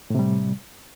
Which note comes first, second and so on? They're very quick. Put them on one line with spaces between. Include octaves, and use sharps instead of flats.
A2 C3 G3